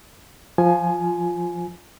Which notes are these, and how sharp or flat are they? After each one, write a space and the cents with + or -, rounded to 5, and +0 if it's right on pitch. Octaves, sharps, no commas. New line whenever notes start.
F3 +0 F4 +5 G#5 +15